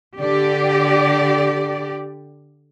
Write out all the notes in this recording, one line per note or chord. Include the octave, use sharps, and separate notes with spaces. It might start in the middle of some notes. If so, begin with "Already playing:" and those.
D3 G4 D5